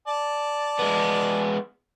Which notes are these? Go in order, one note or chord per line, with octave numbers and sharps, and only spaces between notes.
D5 A5
G#3 B3